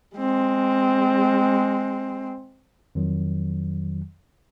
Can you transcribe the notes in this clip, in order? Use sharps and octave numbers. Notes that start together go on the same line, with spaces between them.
G#3 C4
F2 D#3 F#3